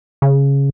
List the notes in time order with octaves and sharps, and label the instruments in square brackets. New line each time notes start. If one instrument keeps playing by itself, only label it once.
[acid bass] C#3